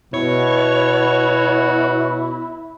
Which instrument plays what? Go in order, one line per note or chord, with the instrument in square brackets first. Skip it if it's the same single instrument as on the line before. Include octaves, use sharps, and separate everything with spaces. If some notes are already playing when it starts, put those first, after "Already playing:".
[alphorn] B2 [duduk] E4 [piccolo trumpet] F#4 [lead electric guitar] C#5